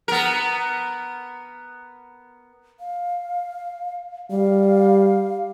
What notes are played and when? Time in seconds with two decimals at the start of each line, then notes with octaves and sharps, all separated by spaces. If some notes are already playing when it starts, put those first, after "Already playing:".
0.08 B3 A#4
2.80 F5
4.31 G3 F5